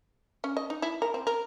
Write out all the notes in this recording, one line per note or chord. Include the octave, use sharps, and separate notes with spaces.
C#4
D#5
D#4
E4
A#4
C4
A#4